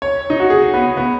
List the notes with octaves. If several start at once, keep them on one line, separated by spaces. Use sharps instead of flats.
C#5
D#4
F#4
G#4
B3
B3